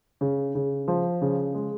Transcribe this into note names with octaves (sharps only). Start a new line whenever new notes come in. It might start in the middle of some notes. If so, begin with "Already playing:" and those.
C#3
C#3
F3
C#3
G#3